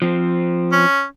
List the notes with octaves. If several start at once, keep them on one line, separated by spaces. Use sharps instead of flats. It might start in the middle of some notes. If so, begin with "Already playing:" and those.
F3 C4
C#4